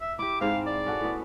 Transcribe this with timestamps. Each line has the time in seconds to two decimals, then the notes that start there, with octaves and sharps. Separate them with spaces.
0.01 E5
0.19 E4 G4 D6
0.41 G#2 C4 F5
0.67 D5
0.86 C#4 F#4 A4
1.01 A2 B3